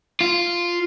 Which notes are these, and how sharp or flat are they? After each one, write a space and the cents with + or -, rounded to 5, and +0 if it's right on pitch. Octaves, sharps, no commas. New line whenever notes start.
F4 -5